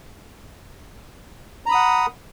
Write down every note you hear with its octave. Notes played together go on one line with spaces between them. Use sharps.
F#5 A#5 B5 D#6